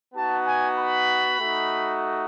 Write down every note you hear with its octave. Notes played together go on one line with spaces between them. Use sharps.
B3 D#4 F#4 A5
G#5
B5
A3 D#4 F#4